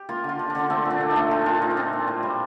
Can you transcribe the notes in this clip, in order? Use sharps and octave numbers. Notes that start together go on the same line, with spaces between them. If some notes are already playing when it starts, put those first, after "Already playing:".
Already playing: G4
A#3 F4
D3 F4
D3
D4
D3
A3 C4
A#2
D4
A3
D#4
A3
A#2 F4
A#2 F4
A3 D#4
D4
A#2 C4
A#3
A2
G3